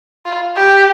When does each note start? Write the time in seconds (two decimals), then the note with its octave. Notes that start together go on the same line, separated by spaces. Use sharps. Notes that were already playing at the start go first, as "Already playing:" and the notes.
0.26 F4
0.56 G4